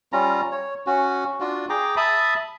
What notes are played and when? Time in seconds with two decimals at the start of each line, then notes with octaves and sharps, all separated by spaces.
0.13 G3 C#4 F4 A#5
0.52 C#5
0.87 C#4 F#4
1.40 D4 F4 F#4
1.69 G#4 G5 A#5 D6
1.97 E5 A5 B5 D#6